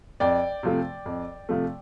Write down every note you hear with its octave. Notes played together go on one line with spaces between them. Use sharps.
F2 D5 G5
C3 F3 A3
F2
C3 F3 A3